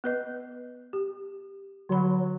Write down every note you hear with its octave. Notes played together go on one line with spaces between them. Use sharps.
B3 B4 D#5
G4
D3 F#3 B5